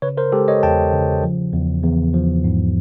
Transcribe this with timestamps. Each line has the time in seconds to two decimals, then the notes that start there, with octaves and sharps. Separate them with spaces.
0.02 C#3 B4 C#5
0.17 A#4 C5
0.32 G#3 G4 A4
0.48 C#5 D#5
0.63 E2 G5 A5
0.93 C#3
1.24 F3
1.53 E2
1.84 E2
2.14 F3
2.44 G#2